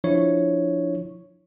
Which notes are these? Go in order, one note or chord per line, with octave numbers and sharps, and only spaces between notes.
F3 D4 E4 C#5